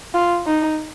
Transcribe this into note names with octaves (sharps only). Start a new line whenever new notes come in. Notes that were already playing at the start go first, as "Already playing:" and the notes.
F4
D#4